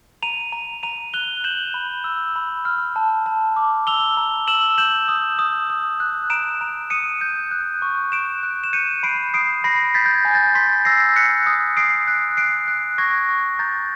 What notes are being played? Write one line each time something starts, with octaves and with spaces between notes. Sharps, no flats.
A#5 D#7 F7
A#5
A#5 D#7 F7
F#6 F7 G7
G6 E7 F#7
B5
E6
B5
F6
A5
A5
D6
E6 F7 G7
A#5
E6 E7 F#7
G6 E7 F#7
D#6
D#6
D#6
F#6
A#5 D7 E7
A#5
D#6 C#7 D#7
G6
F#6
C#6
F#6 D7 E7
F#6
E7
G6 C#7 D#7
B5 C7 D7
D#6 C7 D7
B5 A#6 C7
G6 A6 B6
G6
G#6
G#5
G6 A6
C6 A6 B6
E6 A#6 C7
F#6 B6 C#7
D#6
D#6 C7 D7
F#6
F#6 C7 D7
F#6
C#6 G#6 A#6
C#6
A#5 G6 A6